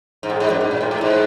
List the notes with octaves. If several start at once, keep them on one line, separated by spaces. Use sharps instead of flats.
G#2
A2
G#2
F#2
G#2
A#2
A2
A2
G#2